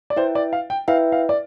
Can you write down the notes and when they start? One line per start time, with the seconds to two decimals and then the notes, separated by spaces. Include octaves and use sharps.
0.10 D5
0.16 E4 B4 C5 E5 G5
0.35 D5
0.53 F5
0.70 G5
0.88 E4 B4 E5 F5 G5
1.12 F5
1.29 D5